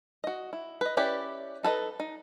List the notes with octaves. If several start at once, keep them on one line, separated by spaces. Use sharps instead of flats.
F#4 D#5
E4
B4 D#5
C#4 E4 G4 B4 D5
D#4 A4 B4 D#5
D#4